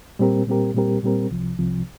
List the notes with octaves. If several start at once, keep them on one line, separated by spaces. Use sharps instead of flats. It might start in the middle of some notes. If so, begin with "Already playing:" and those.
A#2 G3 C4 G4 A#4
A#2 G3 C4 G4 A#4
A#2 G3 C4 G4 A#4
A#2 G3 C4 G4 A#4
C2 C3 F3
C2 C3 F3